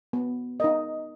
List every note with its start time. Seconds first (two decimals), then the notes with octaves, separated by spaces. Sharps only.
0.13 B3
0.60 D#4 A#4 D#5